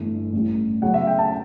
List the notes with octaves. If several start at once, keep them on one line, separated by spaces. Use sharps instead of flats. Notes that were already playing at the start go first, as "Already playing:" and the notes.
Already playing: G1 G2 E3 A3
A1 A2 G3
E2 C#3 F#3 A3 F#5
E5
G5
A5